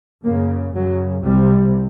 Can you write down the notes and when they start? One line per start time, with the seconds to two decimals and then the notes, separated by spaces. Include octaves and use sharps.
0.24 F#2 C#3 A#3
0.73 F#2 C#3 F#3
1.24 C2 C3 G3